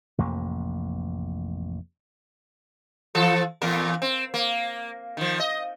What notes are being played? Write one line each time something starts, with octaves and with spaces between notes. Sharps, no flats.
A1 F2 C3 A#3
E3 F3 A4
E2 A#2 A#4
C4
A#3
D#3 F3
D#5